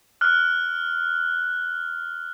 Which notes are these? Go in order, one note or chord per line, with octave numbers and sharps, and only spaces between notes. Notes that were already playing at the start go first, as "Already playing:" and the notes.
F6 F#6